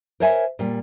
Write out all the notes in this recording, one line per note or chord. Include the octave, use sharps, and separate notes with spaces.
A#4 C5 C#5 E5 G#5
A#2 G3